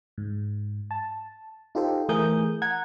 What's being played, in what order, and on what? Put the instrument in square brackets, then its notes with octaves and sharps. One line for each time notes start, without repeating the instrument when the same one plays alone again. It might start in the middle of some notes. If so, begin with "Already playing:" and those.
[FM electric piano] G#2
A5
D#4 F4 G4 A4 C5
E3 A3 G#4 A#4 D#6 G6
F#5 A#5 G#6